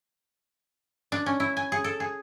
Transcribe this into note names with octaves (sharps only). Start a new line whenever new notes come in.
D4
C#4
E4
G#5
G#4
A4
G#4